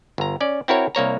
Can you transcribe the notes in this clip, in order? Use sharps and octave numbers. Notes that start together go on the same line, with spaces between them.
G1 A#5
C#4 D5
C4 E4 F#4 A#4 C#5
C2 A#3 C#5 A#5